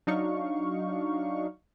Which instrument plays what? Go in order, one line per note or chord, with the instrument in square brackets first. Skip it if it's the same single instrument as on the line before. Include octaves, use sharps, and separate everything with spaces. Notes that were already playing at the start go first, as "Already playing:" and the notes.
[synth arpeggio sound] F#3 D4 D#4 F5 C#6